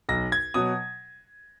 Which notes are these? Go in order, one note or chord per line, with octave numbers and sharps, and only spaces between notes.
B1 A#6
G#6
B2 F#3 D#6